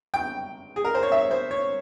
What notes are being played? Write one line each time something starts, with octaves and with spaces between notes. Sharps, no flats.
G5
G#4
A#4
C5
C#5
E5
C5
C#5